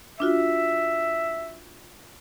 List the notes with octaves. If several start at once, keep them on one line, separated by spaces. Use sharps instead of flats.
D4 F4 F#4 E5